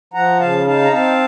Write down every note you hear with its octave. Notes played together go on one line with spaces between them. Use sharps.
F3 F#5 A#5
C#3 F5 A5
D#4 F5 A5
A#5
C4 F5 A5